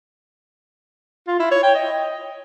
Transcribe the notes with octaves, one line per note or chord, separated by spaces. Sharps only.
F4
E4
C#5
G5
D#5